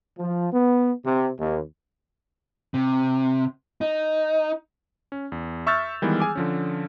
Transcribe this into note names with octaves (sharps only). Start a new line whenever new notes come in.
F3
B3
C3
D#2
C3
D#4
C#4
E2
E5 C#6 E6 F6 G6 A6
D#3 E3 G3 G#3 B3
G#4 G#5 D6
D3 F3 C#4